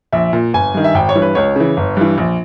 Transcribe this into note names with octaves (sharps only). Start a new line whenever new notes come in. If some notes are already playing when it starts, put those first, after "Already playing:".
A#1 E5
A#2
G1 G#5
G2 D#3
E5
G#1 G5
C#5
G2 E3
B4
C#2 C#5
C#3 E3
G1
G2 E3
A#1